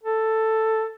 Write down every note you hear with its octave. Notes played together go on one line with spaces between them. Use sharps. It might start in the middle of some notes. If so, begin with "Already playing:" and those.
A4